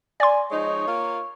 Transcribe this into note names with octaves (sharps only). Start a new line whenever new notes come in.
D5 G#5 C6
F3 G#3 D#4 C#5
A#3 F4